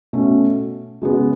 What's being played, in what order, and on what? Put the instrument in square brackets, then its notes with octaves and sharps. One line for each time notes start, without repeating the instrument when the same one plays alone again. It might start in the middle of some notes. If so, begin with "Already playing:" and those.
[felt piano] B2 A3 C#4
C#3 G#3 B3